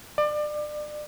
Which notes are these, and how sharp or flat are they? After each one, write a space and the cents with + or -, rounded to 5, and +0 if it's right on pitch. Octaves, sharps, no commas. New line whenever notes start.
D5 +30